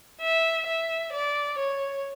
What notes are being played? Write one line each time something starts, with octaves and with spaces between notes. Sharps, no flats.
E5
E5
D5
C#5